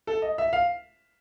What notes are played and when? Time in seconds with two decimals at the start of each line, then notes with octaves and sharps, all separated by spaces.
0.07 A4
0.22 D#5
0.38 E5
0.53 F5